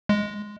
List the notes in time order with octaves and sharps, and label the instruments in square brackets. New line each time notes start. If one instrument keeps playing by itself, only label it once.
[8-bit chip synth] G#3